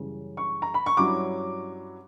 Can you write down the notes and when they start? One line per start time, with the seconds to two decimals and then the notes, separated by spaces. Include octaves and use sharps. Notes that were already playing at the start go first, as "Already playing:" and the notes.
Already playing: F#2 C#3 E3 G3
0.37 C#6
0.62 A#5
0.74 B5
0.86 C#6
0.97 G2 F#3 C#4 E4 D6